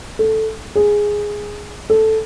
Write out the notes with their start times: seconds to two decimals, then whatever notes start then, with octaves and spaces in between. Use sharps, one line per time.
0.19 A4
0.75 G#4
1.90 A4